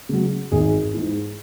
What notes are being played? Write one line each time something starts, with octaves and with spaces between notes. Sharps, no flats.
C#3 F#3
G#1 G#4
G#2 E3